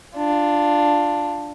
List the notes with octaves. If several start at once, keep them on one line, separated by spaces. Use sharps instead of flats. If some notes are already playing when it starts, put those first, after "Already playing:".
D4 F4